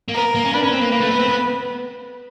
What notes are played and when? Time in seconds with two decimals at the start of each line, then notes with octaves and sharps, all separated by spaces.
0.09 A#3
0.15 B3 A#4
0.35 A#3
0.44 C#4
0.53 D4 B4
0.63 C#4
0.71 C4
0.81 A#3
0.91 A#3
1.00 A3
1.10 B3
1.20 C4
1.29 B3